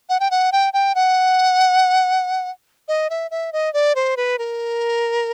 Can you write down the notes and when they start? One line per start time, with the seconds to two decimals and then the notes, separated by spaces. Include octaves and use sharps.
0.09 F#5
0.20 G5
0.31 F#5
0.52 G5
0.73 G5
0.95 F#5
2.88 D#5
3.10 E5
3.31 E5
3.53 D#5
3.74 D5
3.95 C5
4.17 B4
4.39 A#4